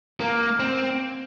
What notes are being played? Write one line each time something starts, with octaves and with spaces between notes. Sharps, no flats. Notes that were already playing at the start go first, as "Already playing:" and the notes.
A#3
C4